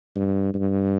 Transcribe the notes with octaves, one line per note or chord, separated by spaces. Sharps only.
G2
G2